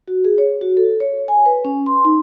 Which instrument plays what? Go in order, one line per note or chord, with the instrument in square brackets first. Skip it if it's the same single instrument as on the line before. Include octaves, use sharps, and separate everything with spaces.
[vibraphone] F#4
G#4
C#5
F#4
A4
C#5
G#5
B4
C#4
C6
D#4